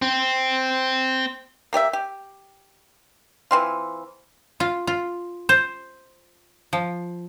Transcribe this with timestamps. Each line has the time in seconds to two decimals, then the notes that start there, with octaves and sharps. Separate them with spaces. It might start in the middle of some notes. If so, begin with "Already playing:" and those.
0.02 C4
1.73 A#3 G4 D5 E5
1.93 G4
3.51 E3 C4 F4
4.60 F4
4.87 F4
5.49 C5
6.73 F3